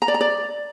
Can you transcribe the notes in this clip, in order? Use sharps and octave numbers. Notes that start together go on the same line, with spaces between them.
A#5
D5
A#5
D5